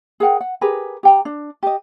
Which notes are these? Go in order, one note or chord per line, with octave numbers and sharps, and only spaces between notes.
G#4 A#4 F#5 G5
F#5
G4 G#4 A#4 B4
G4 G5 A#5
D4
G4 D#5